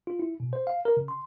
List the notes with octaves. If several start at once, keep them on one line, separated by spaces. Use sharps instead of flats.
F4
E4
B2
C5
F5
A#4
C#3
C6